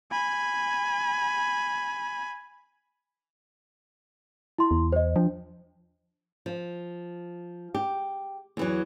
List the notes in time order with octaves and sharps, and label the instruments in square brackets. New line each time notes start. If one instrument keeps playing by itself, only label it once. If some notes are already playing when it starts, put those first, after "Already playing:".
[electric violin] G#5 B5
[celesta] E4 C6
[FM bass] E2
[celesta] C5 D#5
[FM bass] F3 [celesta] D4
[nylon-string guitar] F3
G4
E2 E3 F#3